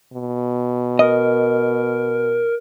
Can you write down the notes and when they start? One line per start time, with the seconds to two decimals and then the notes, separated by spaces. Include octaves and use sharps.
0.13 B2
0.99 A#4 D#5